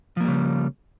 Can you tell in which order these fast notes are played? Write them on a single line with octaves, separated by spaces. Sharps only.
F3 A#3 G3 C#3